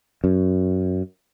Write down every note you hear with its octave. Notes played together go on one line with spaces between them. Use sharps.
F#2